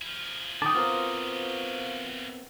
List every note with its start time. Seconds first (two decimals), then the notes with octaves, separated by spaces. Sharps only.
0.01 F3 E4
0.62 D3 D#3 G5 A5 D6 D#6
0.75 B3 C4 F4 F#4 A#4 C5